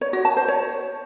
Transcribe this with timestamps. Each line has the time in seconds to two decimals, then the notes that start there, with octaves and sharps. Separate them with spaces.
0.01 C#5
0.13 F#4
0.25 A5
0.37 C5
0.48 C#5